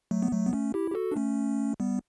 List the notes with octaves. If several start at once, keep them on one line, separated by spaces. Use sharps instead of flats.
F#3 A3
B3
F#3 A3
B3
A3 C#4
E4 G4
G4
F#4 A4
D4
A3 C#4
G3 B3